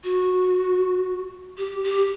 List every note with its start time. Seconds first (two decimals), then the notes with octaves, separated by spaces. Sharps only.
0.04 F#4
1.58 G4
1.84 G4